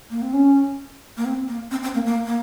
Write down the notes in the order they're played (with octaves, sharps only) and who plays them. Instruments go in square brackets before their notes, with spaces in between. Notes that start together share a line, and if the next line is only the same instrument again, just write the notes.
[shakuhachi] A#3
C4
C#4
A#3
C4
A#3
C4
C4
A#3
A#3
A#3